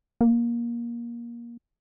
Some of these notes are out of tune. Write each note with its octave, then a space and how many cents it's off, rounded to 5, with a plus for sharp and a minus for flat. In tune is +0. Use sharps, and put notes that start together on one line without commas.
A#3 +20